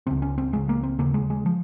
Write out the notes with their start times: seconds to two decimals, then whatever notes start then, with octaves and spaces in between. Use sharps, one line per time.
0.07 C#2 C#3 C4
0.22 C#4
0.38 C4
0.53 C#2 C#3 G#3
0.69 A#3
0.83 C4
0.99 D#2 C#3 A#3
1.14 G#3
1.30 G#3
1.46 F3